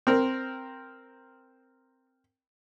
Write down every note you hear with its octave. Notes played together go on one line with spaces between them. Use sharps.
C4 A#4